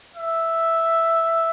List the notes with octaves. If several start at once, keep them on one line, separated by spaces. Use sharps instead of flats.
E5